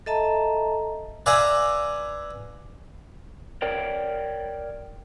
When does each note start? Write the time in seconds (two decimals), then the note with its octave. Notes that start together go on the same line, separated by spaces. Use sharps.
0.06 A4 D#5 E5 A5 A#5
1.26 B4 D5 E5 F5 G#5 A#5
3.62 A#4 C#5 D5 G5